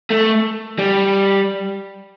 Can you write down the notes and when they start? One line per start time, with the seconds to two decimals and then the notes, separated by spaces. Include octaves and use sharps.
0.11 A3
0.79 G3